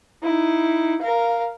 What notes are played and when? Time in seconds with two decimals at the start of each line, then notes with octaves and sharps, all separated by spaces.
0.23 D#4 E4
1.01 A#4 F5